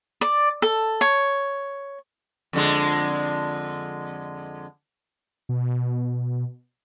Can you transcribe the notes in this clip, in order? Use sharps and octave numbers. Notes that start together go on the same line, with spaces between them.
D5
A4
C#5
F2 D3 G#3
B2